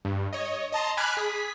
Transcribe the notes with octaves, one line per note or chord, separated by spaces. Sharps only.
G2
C#5 D#5
D#5 A5 A#5 C6
G#5 B5 D6 F6 F#6 G#6
G#4 B6